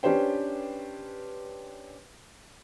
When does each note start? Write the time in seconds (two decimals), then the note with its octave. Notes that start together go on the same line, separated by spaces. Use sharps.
0.03 C#4 D4 G4 B4 C5 G5